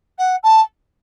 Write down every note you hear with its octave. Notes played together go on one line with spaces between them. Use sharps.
F#5
A5